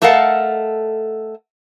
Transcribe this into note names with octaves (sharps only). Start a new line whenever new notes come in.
A3 A4 A#4 D#5 F5 F#5